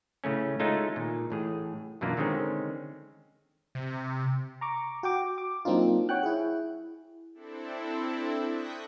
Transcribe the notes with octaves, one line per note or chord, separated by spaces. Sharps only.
A2 C#3 A3 C#4
G#3 A3 C#4 D#4 F4 A4
A#2 D#3
A1 A2 G#4
F#2 B2 E3 A#3 D4 F4
D3 D#3 G#3 C4 C#4
C3
A#5 C#6 D6
F#4 G5 D6
D6
F#3 A#3 C4 D4 D#4 F4
C#5 F#5 G5 F#6
E4 G#4
C4 D4 E4 A4
C#6 D#6 F#6 G6 A#6 B6